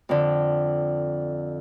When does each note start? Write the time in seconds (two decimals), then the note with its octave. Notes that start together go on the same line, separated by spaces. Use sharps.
0.09 F2 D3